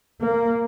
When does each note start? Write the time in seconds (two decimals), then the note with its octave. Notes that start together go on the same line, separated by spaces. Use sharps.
0.21 A#3